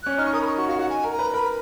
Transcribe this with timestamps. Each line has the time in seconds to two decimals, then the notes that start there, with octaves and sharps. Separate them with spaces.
0.03 C#4 F#6
0.18 D#4 F6
0.25 C#6
0.33 A#4 D#6
0.42 B5
0.47 C#6
0.58 F#4 C#6
0.68 F#4 F5
0.79 F#4 F#5
0.90 G#5
1.04 A#4
1.12 A#5
1.19 B4
1.33 A#4 B5